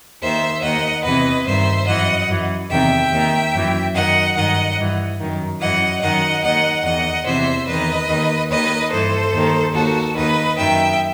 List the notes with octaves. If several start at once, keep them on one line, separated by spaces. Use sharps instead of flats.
D#2 D#3 C5 E5
D#2 D#3 D#5 F#5
E2 C3 E3 B4 D#5
G2 D#3 C5 E5
F#2 E3 D#5 F#5
F#2 E3
E2 C3 D#3 E5 G5
D#2 D#3
F#2 E3
F#2 D#3 D#5 F#5
G2 D#3 D#5 F#5
G2 E3
F#2 D#3
F#2 E3 D#5 F#5
F#2 D#3 D#5 F#5
D#2 D#3 D#5 F#5
E2 D#3 D#5 F#5
E2 C3 E3 C5 E5
E2 D#3 B4 D#5
D#2 D#3
D#2 D#3 B4 D#5
G2 E3 A4 C5
D#2 D#3
D#2 D#3 F#4 A4
D#2 D#3 B4 D#5
F#2 D#3 E5 G5